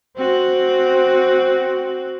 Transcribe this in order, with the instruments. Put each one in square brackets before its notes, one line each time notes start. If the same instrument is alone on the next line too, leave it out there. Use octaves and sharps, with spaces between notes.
[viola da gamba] C4 F#4